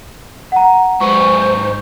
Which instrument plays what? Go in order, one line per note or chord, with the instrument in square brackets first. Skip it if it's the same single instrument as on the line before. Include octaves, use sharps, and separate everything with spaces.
[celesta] F#5 A#5
[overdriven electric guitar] G#2 B4 [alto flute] C5 [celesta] C#6